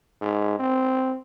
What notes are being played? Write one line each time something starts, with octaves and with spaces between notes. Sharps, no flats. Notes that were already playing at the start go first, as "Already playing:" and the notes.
G#2
C4